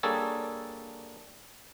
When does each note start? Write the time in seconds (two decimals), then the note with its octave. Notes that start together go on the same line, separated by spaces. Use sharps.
0.03 G3 A#3 D4 G#4 A4 C#5